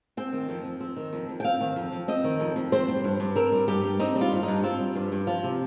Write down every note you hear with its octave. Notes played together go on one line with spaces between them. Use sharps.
C4 G5
D#3
F2
F2
C4
D#3
F2
F2
G5
C4 F5
D#3
F2
F2
C4 D#5
D#3
F2
F2
C4 C5
G3
G2
G2
C4 A#4
G3
G2 G4
G2
C4 D#4
G3
F4
G2
G2 D#4
C4 F4
G3
G2
G2
F3 F4
C3